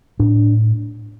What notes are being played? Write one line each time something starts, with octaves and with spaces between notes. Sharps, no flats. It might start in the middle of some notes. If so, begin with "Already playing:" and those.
A2 D4